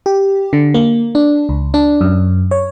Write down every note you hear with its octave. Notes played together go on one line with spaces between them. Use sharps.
G4
D3
A#3
D4
C#2
D4
F#2
C#5